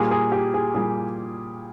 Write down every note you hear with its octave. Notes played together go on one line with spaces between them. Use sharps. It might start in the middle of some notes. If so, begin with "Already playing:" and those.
Already playing: A#2 G3 A#3 G#4
G#4
G4
G#4
A#2 G3 A#3 G#4